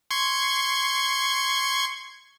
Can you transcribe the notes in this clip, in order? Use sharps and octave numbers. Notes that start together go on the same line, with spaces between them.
C6 C#6 G#6